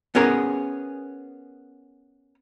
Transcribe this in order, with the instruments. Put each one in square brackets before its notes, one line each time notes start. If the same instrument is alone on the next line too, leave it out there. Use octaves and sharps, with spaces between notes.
[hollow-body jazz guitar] B3 C#4 G#4 A#4